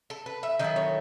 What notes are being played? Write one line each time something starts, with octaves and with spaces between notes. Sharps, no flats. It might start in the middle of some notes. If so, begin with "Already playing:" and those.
A4
B4
E5
D#3 F#3 A3 E4 D#5
C#5